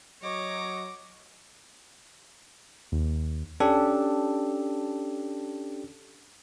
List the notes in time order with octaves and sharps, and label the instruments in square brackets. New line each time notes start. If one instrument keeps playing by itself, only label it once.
[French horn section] F#3 [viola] C#5 [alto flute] D#5 [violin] D6 A#6
[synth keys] D#2
[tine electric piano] C#4 D4 G4 A4